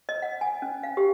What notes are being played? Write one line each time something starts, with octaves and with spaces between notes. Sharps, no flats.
D#5
F#5
G#5
C#4
F5
G4